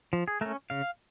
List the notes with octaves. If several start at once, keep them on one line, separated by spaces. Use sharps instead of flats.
F3
G#4
A3 C#4 A#4
C#3 F5